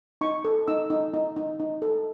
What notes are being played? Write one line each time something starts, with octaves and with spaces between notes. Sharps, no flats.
D#4 C#6
A4
D#4 E6
D#4
D#4
D#4
D#4
A4